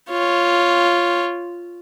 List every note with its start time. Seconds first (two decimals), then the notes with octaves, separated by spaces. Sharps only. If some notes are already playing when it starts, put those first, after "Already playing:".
0.10 F4 C#5